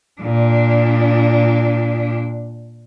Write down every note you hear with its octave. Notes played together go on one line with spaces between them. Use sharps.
A#2 D4